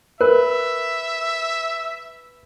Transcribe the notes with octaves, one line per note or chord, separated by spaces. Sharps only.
A#4 B4 E5